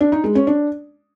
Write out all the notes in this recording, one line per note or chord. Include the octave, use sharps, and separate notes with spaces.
D4
D#4
G#3
C#4
D4